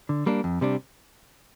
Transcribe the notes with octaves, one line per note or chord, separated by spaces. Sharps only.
D3
G3 A#3 D4
F2
C3 G3 D4